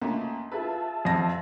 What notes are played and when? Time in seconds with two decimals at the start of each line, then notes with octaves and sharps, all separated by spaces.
0.02 C#2 A3 A#3
0.52 F4 G#4 B4 E5 A5
1.05 F2 A#6